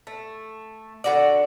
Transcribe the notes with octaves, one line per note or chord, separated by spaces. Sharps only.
A3
D3 F#4 D5